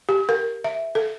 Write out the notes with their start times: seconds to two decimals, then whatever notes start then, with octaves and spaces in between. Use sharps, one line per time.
0.09 G4
0.29 A#4
0.64 E5
0.95 A4